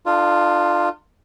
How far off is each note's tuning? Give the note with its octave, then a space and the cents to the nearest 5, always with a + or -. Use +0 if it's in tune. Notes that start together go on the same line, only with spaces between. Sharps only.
D4 +40 F4 +0 A4 +0